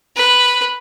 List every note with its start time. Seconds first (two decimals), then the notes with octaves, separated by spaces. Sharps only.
0.16 B4